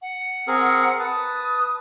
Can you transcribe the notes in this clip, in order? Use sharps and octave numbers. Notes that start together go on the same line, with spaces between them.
F#5
C4 G#4 A#4
B4 A5 D#6